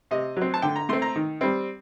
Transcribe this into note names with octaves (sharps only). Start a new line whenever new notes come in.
C3 D#5
F#3 C4
A5
D3 G5
A#5
A3 C4 C6
A#5
D#3
G3 C4